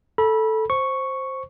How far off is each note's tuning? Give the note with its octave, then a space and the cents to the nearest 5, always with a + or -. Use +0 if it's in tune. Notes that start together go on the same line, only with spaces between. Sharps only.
A4 +0 B5 -30
C5 +5 C#6 +0